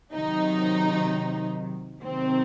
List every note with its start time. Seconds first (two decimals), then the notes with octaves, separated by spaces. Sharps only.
0.13 C3 D#3 F#3 D#4
2.03 C3 D#3 F#3 C4